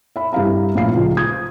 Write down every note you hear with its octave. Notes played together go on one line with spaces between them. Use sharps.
E5 B5
G2 E4 E5 F5 A#5
A#1 A2 E4 F5 C7
C#2 F3
D#6 G#6